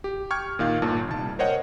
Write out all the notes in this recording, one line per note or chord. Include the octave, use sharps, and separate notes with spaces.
G4
G5 C#6 F6 G#6
A#2 D#3 F5
G1 A#2 D#3 A5
C2 A5
A#4 C5 C#5 D#5 F#5 G5